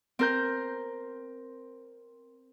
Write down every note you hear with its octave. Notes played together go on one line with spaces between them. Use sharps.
C4 A#4 G6